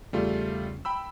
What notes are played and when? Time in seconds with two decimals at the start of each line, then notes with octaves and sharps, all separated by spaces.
0.13 E2 C#3 G3 A3 F4
0.85 G5 B5 E6